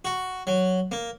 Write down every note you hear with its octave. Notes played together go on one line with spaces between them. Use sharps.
F#4
F#3
A#3